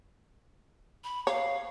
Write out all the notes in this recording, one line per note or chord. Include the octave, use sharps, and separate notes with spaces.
B5
C#5 F5